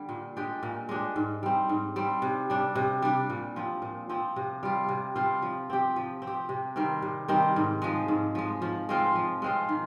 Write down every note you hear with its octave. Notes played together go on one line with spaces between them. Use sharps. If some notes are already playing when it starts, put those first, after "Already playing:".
Already playing: D3 G3
A#2
G#3 D4 G4
A#2
G#3 D4 G4
G#2
G3 C4
G#2
G3 C4
C3
G3 D4
C3
G3 D4
A#2
F3 C4
A#2
F3 C4
C3
G3 C4 F4
C3
G3 C4 F4
F3
C4 G4
F3
C4
G4
C3
D#3 G3 C4
C3
D#3 G3 C4
G#2
F3 G#3
G#2
F3 G#3
F3
G#3 C4 F4
F3
G#3 C4 F4
D#3